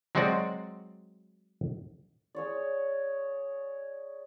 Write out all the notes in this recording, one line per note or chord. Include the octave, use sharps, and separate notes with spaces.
F#3 G#3 C4 F#4 D5
G#4 C#5 D5